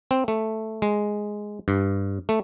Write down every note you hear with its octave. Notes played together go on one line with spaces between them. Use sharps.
C4
A3
G#3
G2
A3